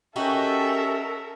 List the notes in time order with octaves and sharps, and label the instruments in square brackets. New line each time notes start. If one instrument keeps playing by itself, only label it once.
[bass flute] C#4 [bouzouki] D#4 F#4 G4 [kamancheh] A4 A#4 [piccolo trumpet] E5